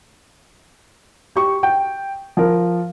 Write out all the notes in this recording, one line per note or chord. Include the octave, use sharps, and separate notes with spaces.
G4 C#6
G5
F3 A#4